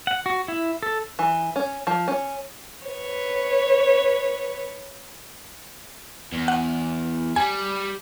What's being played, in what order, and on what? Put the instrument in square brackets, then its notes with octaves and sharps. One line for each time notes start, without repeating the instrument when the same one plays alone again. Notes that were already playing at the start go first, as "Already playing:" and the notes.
[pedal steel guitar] F#5
F#4
E4
A4
[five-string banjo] E3
C#4
F3
C#4
[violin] B4 C#5
[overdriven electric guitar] E2
[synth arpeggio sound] F#5
[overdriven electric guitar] G3 [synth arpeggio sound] G#5